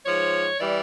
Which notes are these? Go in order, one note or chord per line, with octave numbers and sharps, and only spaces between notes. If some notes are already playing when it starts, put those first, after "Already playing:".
G#2 F3 C#5
E3 G3 D5